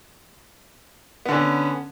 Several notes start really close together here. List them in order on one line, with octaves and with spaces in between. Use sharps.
B3 D3 C#4